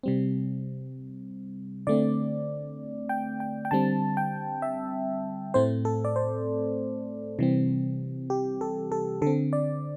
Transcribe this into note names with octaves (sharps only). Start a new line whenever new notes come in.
C3 G3 C4
D3 A3 C4 D5
G5
G5
G5
D3 G3 C4 A5
G5
E5
A2 A3 C4 C5
A4
D5
C5
C3 E3 G3 C4
G4
A4
A4
D3 C4 A4
D5